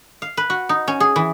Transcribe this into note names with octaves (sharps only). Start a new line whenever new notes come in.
F5
B4
F#4
D#4
C#4
G#4
E3